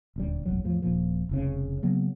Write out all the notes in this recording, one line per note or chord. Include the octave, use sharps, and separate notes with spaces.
D#1 D2 G3
F1 A#1 E2 F#3
E2 A2 F3
D#1 A#2 F3
F1 C2 C#3
C#3 F#3 A#3 B3